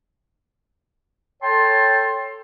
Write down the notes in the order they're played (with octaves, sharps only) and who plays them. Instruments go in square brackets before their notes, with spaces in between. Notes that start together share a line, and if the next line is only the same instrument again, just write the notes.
[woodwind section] A4 C#5 G5 A5 C6